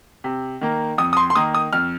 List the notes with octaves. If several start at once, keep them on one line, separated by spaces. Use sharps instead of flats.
C3
D#3 A#3
F2 D#6
D#6
C6
C6
D#3 A#3 D#6
D#6
F2 F6